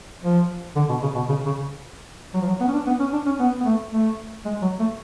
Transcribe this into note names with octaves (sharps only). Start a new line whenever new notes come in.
F3
D3
B2
C#3
B2
C#3
C#3
F#3
F3
F#3
B3
C#4
D4
B3
C#4
D4
C#4
B3
B3
A3
A3
G#3
F#3
A3